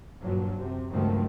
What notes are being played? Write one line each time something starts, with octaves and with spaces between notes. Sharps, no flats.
G2 A#2 F3 F#3
F#2 C3
C#2 G2 D#3 F3 F#3 A3